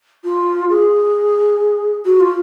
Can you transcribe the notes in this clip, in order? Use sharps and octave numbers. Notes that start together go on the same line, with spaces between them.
F4
G#4
F#4
F4